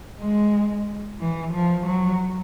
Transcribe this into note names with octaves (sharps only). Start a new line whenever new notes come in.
G#3
E3
F3
F#3